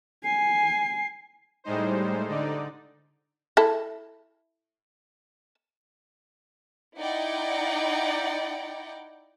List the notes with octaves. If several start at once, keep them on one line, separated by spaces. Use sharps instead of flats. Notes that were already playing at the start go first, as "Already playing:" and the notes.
G#5 C7
A2 G3 G#3 D#4 C5
D3 D#4 D5
E4 A4
D#4 E4 D5 F#5 G5